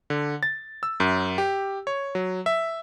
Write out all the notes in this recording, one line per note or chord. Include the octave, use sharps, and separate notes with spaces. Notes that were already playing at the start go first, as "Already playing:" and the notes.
D3
A6
E6
F#2
G4
C#5
F#3
E5